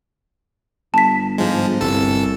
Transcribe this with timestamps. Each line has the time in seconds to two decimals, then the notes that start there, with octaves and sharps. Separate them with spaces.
0.94 G1 A5 B6
1.38 G#2 F3 G#3
1.81 G1 C2 A4 E6